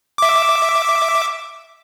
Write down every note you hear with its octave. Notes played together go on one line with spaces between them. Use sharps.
E5 D6